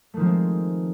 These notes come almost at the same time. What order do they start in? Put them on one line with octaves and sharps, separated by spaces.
A3 D#3 F3 C4 G#3